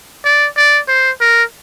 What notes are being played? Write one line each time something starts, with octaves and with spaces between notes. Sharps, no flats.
D5
D5
C5
A#4